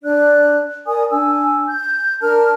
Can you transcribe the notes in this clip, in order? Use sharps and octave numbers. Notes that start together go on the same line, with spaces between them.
D4 D5 F#6
A#4 D5 G#5 D#6
D4 G#5 E6
G6
D4 A#4 A5 F6